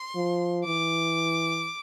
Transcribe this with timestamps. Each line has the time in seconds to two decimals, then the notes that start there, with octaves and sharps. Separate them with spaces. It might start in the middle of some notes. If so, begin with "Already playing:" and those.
Already playing: C6
0.15 F3
0.65 E3 D6